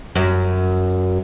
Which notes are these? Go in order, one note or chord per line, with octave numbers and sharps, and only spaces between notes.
F#2